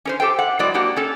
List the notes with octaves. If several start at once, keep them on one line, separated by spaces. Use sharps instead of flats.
C#4 A#4 C5
G4 A4 C5 G5
F#5
F#3 G#3 C4 E4 D5
A#3 D4 F#4 G4
C#4 A4